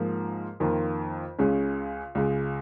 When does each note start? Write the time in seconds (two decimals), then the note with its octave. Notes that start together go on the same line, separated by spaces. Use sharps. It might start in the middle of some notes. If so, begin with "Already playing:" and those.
Already playing: G#2 F3 A#3
0.60 F2 D#3 A#3 F4
1.38 C#2 C#3 G#3 C#4
2.15 C#2 C#3 G#3